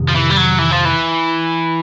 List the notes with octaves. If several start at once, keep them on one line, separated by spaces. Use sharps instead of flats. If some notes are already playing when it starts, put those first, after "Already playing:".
Already playing: F2 C3 D#3
F3
E3
G3
F#3
E3
F3
E3